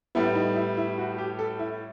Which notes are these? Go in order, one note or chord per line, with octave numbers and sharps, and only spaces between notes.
A2 G3 B3 E4
D#4
E4
E4
F#4
G4
A4
E4